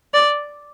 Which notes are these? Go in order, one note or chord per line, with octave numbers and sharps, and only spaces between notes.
D5